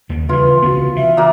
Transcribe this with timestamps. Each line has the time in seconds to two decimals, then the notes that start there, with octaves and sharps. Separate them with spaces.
0.09 D#2 D#3 G3
0.29 C#3 E3 F4 B4
0.62 C2 C#3 B3 F#4
0.96 E3 E5
1.17 A#2 A#3